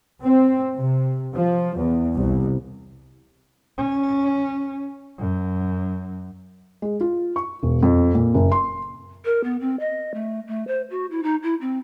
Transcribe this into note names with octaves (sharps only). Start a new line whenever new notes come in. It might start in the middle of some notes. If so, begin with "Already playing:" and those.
C4
C3
F3
E2
C2
C#4
F#2
G#3
F4
C#6
E1
F2
A#2
F#1
C6
A#4
B3
C4
D#5
A3
A3
C5
F#4
E4
D#4
E4
C4